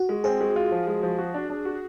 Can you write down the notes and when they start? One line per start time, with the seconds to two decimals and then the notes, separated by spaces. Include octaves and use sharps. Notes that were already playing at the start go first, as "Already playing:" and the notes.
Already playing: F#4
0.09 G#3
0.24 C4 G#4
0.41 G#3
0.56 F4
0.72 F3
0.87 G#3
1.03 F3
1.18 F#4
1.34 D4
1.50 D4
1.65 F#4